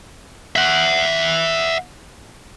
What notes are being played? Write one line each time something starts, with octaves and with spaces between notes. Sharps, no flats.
E5 F#5